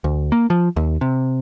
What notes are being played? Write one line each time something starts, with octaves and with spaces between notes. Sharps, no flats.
D2
A#3
F3
D#2
C3